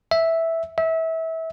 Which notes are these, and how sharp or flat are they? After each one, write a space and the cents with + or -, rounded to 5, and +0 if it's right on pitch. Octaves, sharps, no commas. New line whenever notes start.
E5 -5
E5 -25